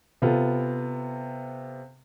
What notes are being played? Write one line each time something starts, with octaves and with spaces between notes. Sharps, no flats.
C3 B3 F4 A4